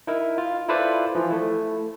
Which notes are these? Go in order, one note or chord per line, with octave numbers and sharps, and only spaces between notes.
D#4 E4 A#4
F4
E4 F4 A4 B4 C5 D5
E3 F3
A3 E4